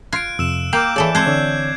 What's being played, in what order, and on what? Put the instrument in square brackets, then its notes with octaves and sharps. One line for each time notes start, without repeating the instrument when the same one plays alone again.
[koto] F4 [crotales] F#6 D7 [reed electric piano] G#6
[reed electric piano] F2 C3 [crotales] E6 E7
[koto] A#3 [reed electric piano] G5 A#5 F6 [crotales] D6 G6 D7
[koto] E3 A4 D5 [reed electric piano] G#4 C#5
[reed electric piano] G#3 [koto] C4 A4 [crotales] F#6 G#6 C7
[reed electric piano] D3 C#5 D5